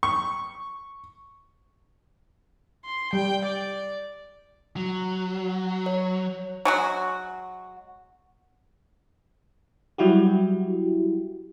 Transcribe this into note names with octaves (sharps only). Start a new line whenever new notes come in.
C#6
C6
G3 G5
D5
F#3
C#5
F#3 G#3 F#4
F#3 G3 E4 F#4 G4